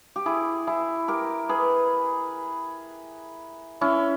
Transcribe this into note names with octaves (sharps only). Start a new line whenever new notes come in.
G4
E4 G#4
E4 G#4
G4 A#4
G#4 B4
C#4 E4